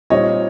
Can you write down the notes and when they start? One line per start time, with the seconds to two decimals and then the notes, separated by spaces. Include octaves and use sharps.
0.10 A#2 G3 C4 D#4 C#5 D#5